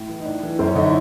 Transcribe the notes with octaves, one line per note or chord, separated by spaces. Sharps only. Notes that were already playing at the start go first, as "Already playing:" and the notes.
Already playing: A2
E3
D#4
A2 D4
E3
F#2 C4
C#4
D3 D#4
E4